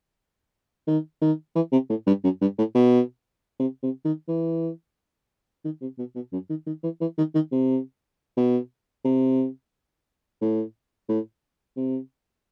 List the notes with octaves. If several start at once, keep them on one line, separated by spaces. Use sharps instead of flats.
D#3
D#3
E3
C3
A2
G2
F#2
G2
A2
B2
C3
C3
D#3
E3
D#3
C3
B2
B2
F#2
D#3
D#3
E3
E3
D#3
D#3
C3
B2
C3
A2
A2
C3